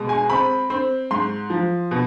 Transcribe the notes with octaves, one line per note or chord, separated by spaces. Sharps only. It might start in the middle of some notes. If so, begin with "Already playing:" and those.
Already playing: B2 G#3
G#5
C4 B5
C4
G#2 C6
F3
B2